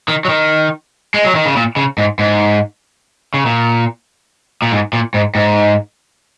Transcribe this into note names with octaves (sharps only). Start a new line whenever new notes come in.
D#3
F#3
D#3
G#3
F#3
D#3
C#3
A#2
C#3
G#2
G#2
C#3
A#2
A#2
G#2
A#2
G#2
G#2